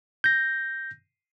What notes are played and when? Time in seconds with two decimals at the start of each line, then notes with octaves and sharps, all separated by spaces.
0.24 G6 A#6